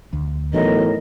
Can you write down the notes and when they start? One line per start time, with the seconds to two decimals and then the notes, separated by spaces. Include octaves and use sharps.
0.13 D2
0.53 B1 A2 E3 A#4 D#5